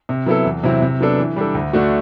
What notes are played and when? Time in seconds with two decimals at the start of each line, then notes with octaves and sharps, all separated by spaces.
0.09 C3
0.26 F#3 B3 E4 A4
0.45 E2
0.63 C3 F#3 C4 E4
0.82 C3
1.01 F#3 B3 D4 A4
1.18 E3
1.36 G3 D4 A4
1.54 D2
1.73 D3 A3 D4 F#4